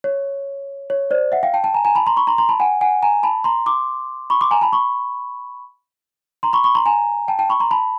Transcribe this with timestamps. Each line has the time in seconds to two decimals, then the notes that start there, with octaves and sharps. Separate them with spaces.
0.04 C#5
0.90 C#5
1.11 C5 D5
1.32 E5 F#5
1.43 F5 G5
1.54 G5 A5
1.64 G5 A5
1.74 G#5 A#5
1.85 G#5 A#5
1.95 A5 B5
2.07 A#5 C6
2.17 B5 C#6
2.27 A#5 C6
2.38 A#5 C6
2.49 A5 B5
2.60 F#5 G#5
2.81 F#5 G#5
3.03 G#5 A#5
3.23 A5 B5
3.44 A#5 C6
3.66 C6 D6
4.30 B5 C#6
4.41 C6 D6
4.51 G#5 A#5
4.61 A5 B5
4.73 B5 C#6
6.43 A#5 C6
6.53 B5 C#6
6.64 B5 C#6
6.75 A#5 C6
6.86 G#5 A#5
7.28 G5 A5
7.39 G5 A5
7.50 B5 C#6
7.60 A#5 C6
7.71 A5 B5